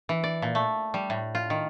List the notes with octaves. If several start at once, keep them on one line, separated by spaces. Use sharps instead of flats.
E3
D5
A#2
A3
G3
A2
F4
D#3